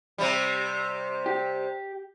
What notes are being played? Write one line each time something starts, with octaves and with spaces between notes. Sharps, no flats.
C3 G3
G4